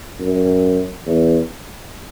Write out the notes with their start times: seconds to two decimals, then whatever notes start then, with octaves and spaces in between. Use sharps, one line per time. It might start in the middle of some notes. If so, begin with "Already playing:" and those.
0.19 F#2
1.06 E2